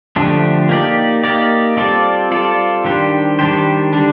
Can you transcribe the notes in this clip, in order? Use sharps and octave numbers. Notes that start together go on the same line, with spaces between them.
D3 F3 A3 D4 G4
A#3 D#4 G4 D5
A#3 D#4 G4 D5
G3 C4 F4 A4 D5
G3 C4 F4 A4 D5
D#3 G3 D4 G4 C5
D#3 G3 D4 G4 C5
D3 G3 D4